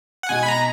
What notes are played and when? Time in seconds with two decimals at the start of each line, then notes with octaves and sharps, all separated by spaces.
0.23 F#5
0.29 B2 G#3 D#4 G#4 D#5 G#5
0.43 B5
0.48 A#5